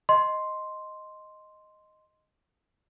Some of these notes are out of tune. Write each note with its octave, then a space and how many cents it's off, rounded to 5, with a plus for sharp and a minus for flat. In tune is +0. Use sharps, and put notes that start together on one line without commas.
D#5 +0 C6 +0